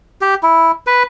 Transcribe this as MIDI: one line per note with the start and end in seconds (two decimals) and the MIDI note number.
0.21 0.35 67
0.43 0.72 64
0.87 1.03 71